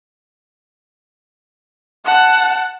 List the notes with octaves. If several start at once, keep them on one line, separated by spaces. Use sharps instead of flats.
F#5 A5